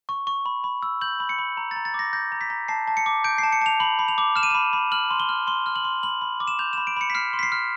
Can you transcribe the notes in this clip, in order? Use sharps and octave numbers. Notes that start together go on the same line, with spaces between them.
C#6
C#6
B5
B5
E6
G6 F#7
B5
C#7
B5
A#5
A6
A#5
A6
D6 A#6
G6 A#6
A#5
B6
A#5
A5 C7
A5
C#7
D6
G6 D7
C7
A5
C#7
A5 F7
B5 F#7
B5
F7
D6
F6 E7
D#7
B5 E7
B5
F6 F#7
C6
G7
F6
C6 G7
F6
F#7
C6
B5 F#7
B5
D6
E7
G6 F7
E7
B5
D7
B5 C#7
B6
F6 C7
C6
B6
C7
F6